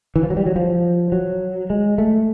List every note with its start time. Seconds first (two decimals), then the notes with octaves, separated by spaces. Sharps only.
0.16 E3
0.23 F3
0.30 F#3
0.37 G3
0.46 F#3
0.56 F3
1.12 F#3
1.70 G#3
1.98 A3